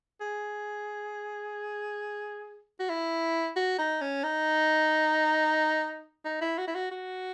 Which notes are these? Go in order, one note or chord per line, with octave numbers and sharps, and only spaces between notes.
G#4
F#4
E4
F#4
D#4
C#4
D#4
D#4
E4
F#4
E4
F#4
F#4